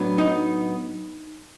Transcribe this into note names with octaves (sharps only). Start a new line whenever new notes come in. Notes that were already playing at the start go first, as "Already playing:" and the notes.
Already playing: A2 F#3 B3 D4
D#4